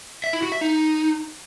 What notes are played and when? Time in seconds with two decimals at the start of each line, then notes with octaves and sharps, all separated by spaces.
0.24 E5
0.33 E4
0.43 F#4
0.52 E5
0.61 D#4